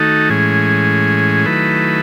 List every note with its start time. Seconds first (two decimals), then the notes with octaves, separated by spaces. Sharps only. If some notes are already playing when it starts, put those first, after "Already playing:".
Already playing: D#3 A3 D#4 F#4 A4
0.29 A2 E3 G#3 C#4 G#4
1.46 D#3 F#3 A3 E4 B4